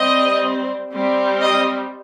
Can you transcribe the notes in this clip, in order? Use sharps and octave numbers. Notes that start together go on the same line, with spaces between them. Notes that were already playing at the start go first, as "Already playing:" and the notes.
Already playing: G3 C4 D#5
G3 C4
D#5